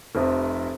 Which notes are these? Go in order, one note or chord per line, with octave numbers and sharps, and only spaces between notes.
F1 F2 C3